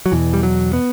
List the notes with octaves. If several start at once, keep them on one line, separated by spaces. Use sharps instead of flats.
F#3
E2 B2 E3
G3
F#3
B3